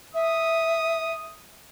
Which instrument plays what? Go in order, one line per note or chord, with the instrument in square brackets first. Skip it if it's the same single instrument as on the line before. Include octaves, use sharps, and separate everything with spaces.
[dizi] E5 [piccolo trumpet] D#6